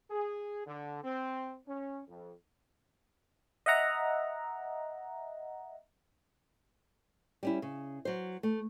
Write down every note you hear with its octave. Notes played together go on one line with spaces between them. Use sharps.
G#4
D3
C4
C#4
F2
D#5 E5 F#5 A#5
G3 C#4 E4
C#3
F#3 C5
A3